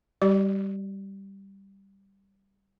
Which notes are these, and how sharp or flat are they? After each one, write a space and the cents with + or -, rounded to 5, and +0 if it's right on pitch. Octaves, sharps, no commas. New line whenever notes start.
G3 +0 G4 -30 D5 +0